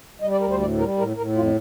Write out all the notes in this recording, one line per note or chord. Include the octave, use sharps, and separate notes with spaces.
G3 D#5
D5
D2 A#4
C5
A2 D5
G3 A#4
A2 A#4
A2 A#4
F2 F4